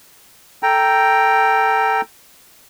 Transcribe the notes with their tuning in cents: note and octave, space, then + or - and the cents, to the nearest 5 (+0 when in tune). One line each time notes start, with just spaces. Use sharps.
A4 +5 G5 +0 A#5 +0